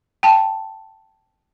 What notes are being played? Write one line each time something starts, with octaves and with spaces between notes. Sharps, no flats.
G5 A5